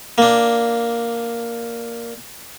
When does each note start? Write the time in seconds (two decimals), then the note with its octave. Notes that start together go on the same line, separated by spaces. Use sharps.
0.18 A#3 D4